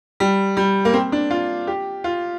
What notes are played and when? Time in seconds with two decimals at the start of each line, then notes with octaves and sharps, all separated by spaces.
0.20 G3
0.57 G3
0.85 A#3
0.93 C4
1.12 D4
1.31 F4
1.67 G4
2.04 F4